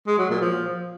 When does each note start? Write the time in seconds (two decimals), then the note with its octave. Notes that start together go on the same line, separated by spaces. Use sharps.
0.07 G#3
0.18 F#3
0.30 A#2
0.42 F3